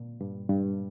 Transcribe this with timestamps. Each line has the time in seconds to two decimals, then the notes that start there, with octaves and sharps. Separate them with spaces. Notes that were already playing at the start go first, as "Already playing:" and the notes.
Already playing: A#2
0.21 G2
0.50 G2